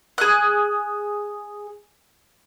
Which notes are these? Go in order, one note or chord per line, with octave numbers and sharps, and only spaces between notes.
G#4 F#6